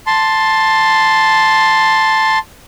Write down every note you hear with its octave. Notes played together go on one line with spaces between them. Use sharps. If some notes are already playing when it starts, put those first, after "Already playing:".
A5 C6